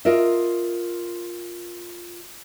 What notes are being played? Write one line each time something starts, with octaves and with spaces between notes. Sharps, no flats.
F4 A#4 D#5 E5